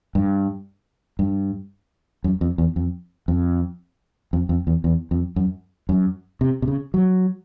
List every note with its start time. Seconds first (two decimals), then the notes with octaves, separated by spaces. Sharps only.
0.15 G2
1.19 G2
2.24 F#2
2.41 F2
2.58 E2
2.76 F2
3.28 F2
4.33 F2
4.49 F2
4.67 E2
4.84 E2
5.11 F2
5.36 F#2
5.89 F#2
6.41 C3
6.62 C3
6.68 C#3
6.94 F#3